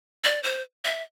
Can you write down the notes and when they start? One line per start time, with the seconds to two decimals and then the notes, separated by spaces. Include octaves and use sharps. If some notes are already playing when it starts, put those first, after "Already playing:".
0.24 D5
0.43 C5
0.85 E5